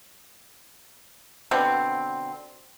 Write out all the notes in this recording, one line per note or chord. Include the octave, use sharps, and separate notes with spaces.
B2 D3 C4